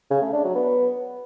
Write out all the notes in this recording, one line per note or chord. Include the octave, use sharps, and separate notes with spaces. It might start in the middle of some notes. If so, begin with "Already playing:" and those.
C#3
A3
D4
F#3
B3